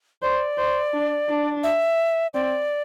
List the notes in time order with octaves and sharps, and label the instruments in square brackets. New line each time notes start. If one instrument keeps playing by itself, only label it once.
[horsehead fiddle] C5 [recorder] D5
[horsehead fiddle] C5
D4
D4
[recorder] E5
[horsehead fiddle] C4 [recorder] D5